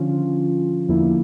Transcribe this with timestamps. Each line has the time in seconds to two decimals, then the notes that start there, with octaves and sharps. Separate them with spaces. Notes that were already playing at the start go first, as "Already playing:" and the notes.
Already playing: D3 F3 C#4 F4
0.89 E2 D3 F3 A#3 E4